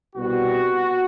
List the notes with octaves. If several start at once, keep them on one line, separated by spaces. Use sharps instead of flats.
C2 B2 G3 B3 F#4